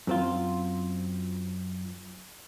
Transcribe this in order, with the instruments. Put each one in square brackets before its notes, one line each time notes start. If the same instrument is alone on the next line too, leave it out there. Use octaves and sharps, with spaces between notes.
[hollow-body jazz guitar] F#2 C4 F4